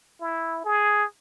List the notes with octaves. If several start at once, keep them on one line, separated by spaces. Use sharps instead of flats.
E4
G#4